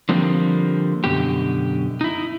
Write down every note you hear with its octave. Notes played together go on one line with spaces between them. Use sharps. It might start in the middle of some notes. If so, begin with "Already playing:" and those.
D3 F3 G3 A#3 C4
F#2 B2 D3 G4
D#4 E4